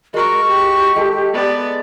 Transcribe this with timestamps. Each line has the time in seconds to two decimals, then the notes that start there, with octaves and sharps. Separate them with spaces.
0.14 G#3 F#4 A#4 C#6
0.48 G4
0.96 G#3 A4
1.33 B3 D5